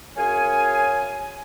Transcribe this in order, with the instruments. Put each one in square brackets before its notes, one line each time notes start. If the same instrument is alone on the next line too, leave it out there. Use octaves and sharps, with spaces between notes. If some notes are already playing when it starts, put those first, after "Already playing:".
[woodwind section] F#2 G#4 C#5 F5 G#5